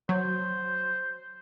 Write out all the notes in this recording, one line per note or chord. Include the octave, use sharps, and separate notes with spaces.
F#3 C5